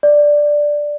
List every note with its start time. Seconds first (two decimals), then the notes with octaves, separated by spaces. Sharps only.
0.03 D5